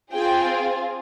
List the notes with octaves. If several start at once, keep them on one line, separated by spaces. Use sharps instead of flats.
C4 F4 G#4 G5